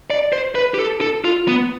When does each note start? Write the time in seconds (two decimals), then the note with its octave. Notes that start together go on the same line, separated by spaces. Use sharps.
0.10 D5
0.33 C5
0.55 B4
0.74 G4
0.79 A4
1.01 A4
1.25 F4
1.48 B3